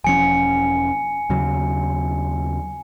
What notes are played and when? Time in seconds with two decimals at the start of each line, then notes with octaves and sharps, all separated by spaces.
0.04 E1 F3 C#4 G#5 C#7
1.30 D#2 C#3 F#3